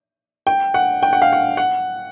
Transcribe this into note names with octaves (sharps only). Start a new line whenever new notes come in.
G5
F#5
G5
F#5
F5
F#5
F#5